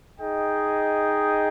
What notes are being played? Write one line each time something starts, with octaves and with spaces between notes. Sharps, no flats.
D#4 G#4 D#5 G5